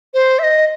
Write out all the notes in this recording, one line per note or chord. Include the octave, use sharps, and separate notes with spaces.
C5
E5
D#5